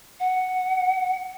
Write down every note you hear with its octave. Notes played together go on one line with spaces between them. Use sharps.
F#5